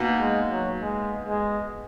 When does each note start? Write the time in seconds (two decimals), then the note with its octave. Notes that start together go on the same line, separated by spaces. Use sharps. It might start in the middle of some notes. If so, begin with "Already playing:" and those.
Already playing: B2 A#3 D#4
0.19 G#3
0.49 F#3
0.80 G#3
1.25 G#3